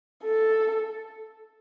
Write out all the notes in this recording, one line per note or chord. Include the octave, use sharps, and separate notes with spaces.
A4